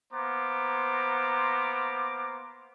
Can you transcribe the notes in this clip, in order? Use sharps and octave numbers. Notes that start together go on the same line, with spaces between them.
A#3 B3 C5 A#5 D6